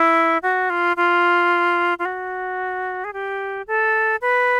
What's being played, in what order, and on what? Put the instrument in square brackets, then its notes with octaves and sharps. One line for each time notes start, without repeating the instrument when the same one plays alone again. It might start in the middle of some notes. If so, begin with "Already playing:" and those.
Already playing: [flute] E4
F#4
F4
F4
F4
F#4
G#4
G4
A4
B4